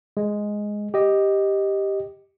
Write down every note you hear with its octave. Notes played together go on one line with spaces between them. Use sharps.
G#3
G4 D#5